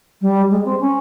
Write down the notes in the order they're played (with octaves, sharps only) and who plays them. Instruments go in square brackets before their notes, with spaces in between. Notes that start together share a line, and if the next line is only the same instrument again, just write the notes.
[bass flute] G3
G#3
C4
C#4